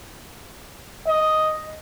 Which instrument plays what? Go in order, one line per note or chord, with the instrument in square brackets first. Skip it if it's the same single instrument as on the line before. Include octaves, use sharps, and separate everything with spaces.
[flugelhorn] D#5